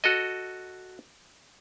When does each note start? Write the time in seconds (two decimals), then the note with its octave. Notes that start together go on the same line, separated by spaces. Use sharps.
0.04 F#4 A4 D#5